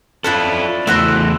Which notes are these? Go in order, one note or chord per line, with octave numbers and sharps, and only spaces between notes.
C#4 D4 E4 F4 A4
E2 A3 E4 F#4 C5